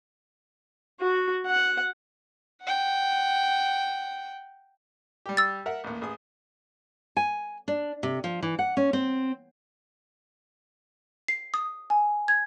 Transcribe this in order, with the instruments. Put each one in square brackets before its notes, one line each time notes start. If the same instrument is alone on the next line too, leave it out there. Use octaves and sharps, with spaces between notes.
[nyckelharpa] F#4
F#5
[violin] F#5 G5
[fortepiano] G3 G4
[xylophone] E6 A6
[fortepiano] A#4 E5 F#5
A1 D#2
A1 G#4 D#6
[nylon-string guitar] G#5
D4
C3
F3
E3
F#5
C#4
C4
[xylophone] C7
D#6
G#5
G#6